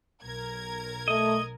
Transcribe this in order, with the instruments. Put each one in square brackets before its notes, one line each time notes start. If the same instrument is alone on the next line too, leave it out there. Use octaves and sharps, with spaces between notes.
[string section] B1 A#4 G#6
[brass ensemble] A3 [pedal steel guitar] D#5